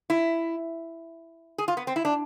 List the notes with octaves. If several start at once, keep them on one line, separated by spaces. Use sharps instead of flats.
E4
G#4
F4
B3
C4
E4
D4